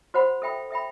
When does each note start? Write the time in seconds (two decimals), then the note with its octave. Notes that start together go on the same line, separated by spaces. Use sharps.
0.14 F#4 C5 F#5 B5
0.42 A4 E5 G5 B5
0.71 A4 E5 G5 B5